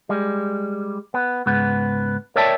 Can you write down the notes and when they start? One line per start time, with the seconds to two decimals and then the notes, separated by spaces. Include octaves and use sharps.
0.09 G3 G#3
1.14 B3
1.46 C#2 G#2 B3
2.36 A#4 C#5 D5 E5 G5 A5